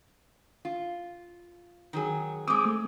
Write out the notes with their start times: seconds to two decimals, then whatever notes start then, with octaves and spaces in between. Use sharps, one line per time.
0.65 F4
1.93 D#3 F#3 G#4
2.48 G#3 C4 D6 D#6
2.65 A3